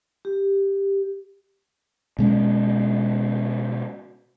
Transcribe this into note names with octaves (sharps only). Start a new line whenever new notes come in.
G4
B2 G#3 C#4